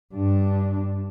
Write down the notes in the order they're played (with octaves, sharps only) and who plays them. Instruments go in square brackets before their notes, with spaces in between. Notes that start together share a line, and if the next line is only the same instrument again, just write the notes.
[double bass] G2 D4